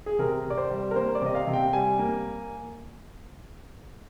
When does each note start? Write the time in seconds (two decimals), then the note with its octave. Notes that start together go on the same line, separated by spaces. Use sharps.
0.06 G#4
0.19 C3 A#4
0.45 C3
0.50 D5
0.57 C5
0.71 G3
0.91 A#4
0.96 A#3 C5
1.15 D5
1.22 C3 D#5
1.35 F5
1.47 C3
1.53 G5
1.73 G3 G#5
1.99 A#3